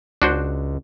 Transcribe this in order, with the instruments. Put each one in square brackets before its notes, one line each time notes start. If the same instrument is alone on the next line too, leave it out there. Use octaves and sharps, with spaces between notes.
[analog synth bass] C#2 [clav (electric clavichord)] D4 F#4 C5